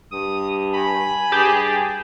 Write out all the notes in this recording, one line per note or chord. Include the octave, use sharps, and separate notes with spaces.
G2 D#6
G#5 B5
G2 G4 G#4 A5